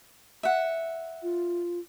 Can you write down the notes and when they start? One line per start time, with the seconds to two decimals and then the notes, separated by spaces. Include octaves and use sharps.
0.43 E5 F#5
1.23 F4